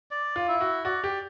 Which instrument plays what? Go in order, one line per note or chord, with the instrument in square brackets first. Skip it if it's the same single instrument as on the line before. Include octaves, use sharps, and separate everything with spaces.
[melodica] D5
[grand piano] F4
[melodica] E4
[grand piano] F#4
[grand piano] F#4 [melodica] D5
[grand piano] G4